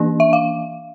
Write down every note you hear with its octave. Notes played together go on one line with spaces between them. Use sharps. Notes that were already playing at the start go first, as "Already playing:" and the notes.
Already playing: E3 A#3 D4
E5
F5